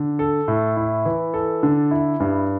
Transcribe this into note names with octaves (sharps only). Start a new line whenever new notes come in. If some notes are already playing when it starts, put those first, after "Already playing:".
Already playing: D3
A4
A2
E4
E3
A4
D3
E4
G2